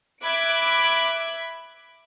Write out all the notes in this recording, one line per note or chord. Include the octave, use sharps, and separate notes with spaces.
E5 B5 D6 F#6 G#6 D7